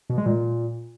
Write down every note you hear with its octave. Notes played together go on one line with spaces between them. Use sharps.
B2
G#3
A#2